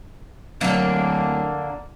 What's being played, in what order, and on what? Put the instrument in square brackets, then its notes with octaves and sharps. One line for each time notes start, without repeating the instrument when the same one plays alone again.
[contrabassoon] D1 [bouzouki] D3 A#3 [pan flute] F#3